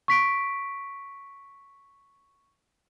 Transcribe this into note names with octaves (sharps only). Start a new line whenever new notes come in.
C#6 B6 D7